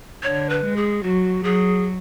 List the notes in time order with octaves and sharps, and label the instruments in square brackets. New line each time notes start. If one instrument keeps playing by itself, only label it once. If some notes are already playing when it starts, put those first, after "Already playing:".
[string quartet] D3 [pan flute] C#5
[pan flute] B4
[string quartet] G#3
[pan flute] G#4
[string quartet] F#3 [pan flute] F#4
[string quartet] F#3 [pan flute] G#4